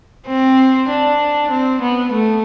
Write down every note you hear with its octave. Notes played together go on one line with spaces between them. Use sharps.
C4
D4
C4
B3
A3